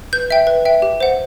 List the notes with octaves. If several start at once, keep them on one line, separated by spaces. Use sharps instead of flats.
B4 G6
E5 G5
B4
E5 G5
G4
C5 F#5